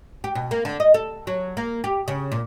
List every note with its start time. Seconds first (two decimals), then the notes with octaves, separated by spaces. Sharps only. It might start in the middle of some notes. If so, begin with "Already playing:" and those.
0.24 G4
0.35 B2
0.51 A#3
0.65 D3
0.80 D#5
0.94 A4
1.27 F#3
1.57 A#3
1.84 G4
2.08 C#3
2.32 A#2